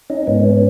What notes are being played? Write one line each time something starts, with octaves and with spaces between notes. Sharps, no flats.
C#4 D#4
G#2 B3 C#4
B3 C#4